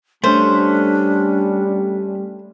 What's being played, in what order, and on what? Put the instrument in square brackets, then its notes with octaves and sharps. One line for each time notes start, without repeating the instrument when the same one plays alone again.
[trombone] G3 [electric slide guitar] A3 C#4 [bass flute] D4 [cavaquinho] C5